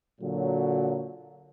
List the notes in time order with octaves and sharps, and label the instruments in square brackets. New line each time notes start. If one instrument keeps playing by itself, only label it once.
[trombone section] A#2 D3 F#3